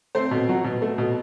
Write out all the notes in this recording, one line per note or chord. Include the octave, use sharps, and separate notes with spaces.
A3 C4 C5
B2
F#3
B2
A3
B2